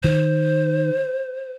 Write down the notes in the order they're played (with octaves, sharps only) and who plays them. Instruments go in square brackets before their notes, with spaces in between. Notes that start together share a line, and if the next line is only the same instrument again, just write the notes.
[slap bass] D#3 [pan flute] C5